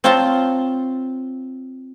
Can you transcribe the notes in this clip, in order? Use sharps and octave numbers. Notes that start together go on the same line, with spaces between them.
C4 F4 C#5 A5 A#5 C6